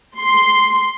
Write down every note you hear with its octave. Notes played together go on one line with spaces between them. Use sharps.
C6